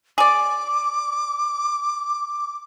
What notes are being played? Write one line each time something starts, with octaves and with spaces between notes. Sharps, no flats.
G#4 D5 D6